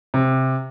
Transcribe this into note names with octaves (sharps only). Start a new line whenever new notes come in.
C3